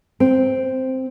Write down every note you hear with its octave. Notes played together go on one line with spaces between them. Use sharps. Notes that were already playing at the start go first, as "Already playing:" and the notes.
C4